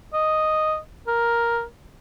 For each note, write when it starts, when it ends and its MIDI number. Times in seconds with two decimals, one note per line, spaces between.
0.14 0.78 75
1.07 1.63 70